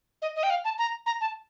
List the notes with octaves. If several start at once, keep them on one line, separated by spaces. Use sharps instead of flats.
D#5
D#5
G5
F5
A5
A#5
A#5
A5